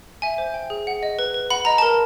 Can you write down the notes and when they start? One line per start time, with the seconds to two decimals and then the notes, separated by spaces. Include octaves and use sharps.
0.22 E5 G#5
0.38 C5
0.54 G5
0.70 G#4
0.87 F#5
1.03 D#5
1.19 B4
1.34 B4
1.50 F#5 B5
1.65 D#5 A#5
1.78 A#4 A5